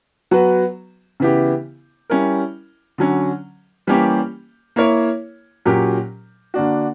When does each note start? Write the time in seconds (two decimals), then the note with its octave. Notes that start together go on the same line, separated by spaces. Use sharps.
0.31 F#3 B3 F#4 B4
1.20 C#3 E3 B3 E4 G4
2.10 G3 C#4 E4 A#4
2.98 D3 F#3 C#4
3.87 E3 G3 A#3 C#4 G4
4.76 A#3 E4 A#4 C#5
5.65 A#2 F#3 C#4 G4 A#4
6.54 D3 A#3 D4 F#4